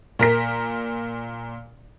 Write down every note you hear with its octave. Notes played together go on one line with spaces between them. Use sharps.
A#2 A#4 B6